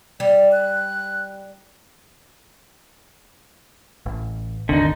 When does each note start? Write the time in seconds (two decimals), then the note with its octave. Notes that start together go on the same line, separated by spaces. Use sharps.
0.20 G3 D5
0.52 F#6
4.06 A1
4.69 G#1 D#2 D3 D#3 D#4